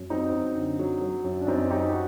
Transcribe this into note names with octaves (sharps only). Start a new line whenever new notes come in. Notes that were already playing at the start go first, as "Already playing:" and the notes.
Already playing: F#2
F#3 C4 D#4
F#2
D3
F#3
F#3
F#2
D4
F#2 C4 D#4
F#3 D#4 G4
F#4